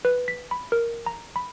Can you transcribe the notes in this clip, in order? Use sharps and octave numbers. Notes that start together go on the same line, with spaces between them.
B4
B6
B5
A#4
A#5
B5